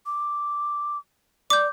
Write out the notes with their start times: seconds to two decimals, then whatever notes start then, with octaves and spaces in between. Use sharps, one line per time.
0.06 D6
1.50 D5 D6 G6